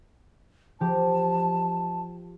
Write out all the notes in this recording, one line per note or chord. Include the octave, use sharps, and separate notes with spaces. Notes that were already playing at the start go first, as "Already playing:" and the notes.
F3 G4 A5